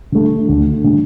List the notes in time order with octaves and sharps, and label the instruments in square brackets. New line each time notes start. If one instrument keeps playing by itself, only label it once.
[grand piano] D3 A3
D2
D3 A3